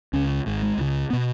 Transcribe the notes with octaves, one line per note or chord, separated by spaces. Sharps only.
C#2 C#3 C#4
G#1 G#2
G#3
C#2 C#3
B3
B2